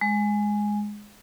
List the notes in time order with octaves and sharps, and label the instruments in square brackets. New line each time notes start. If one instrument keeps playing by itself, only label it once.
[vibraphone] G#3